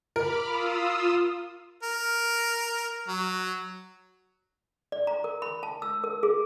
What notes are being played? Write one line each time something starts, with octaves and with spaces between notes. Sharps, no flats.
A#4 B5 D6 F6
F4 D#6 E6
A#4
F#3
D5
A#5
A#4
B5
A5
E6
A#4
G#4